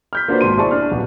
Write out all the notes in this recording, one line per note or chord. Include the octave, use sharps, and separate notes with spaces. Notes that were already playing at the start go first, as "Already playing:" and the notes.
F6 G6 B6
A#3 D4 F4 F#4 B4 C5
G#1 B2 C6 D#7
E4 G#4 C5 D5 A5 C#6
D4 F6
D#1 B1 B3